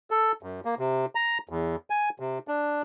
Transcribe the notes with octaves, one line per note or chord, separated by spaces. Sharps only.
A4
F#2
A#3
C3
A#5
E2
G#5
C3
D4